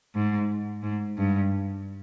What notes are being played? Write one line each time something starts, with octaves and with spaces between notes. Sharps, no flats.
G#2
G#2
G2